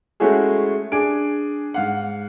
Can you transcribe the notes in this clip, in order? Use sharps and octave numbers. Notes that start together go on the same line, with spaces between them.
G#3 A3 C#4 E4 F#4 G#4
D4 G#4 D7
G#2 F5 F#5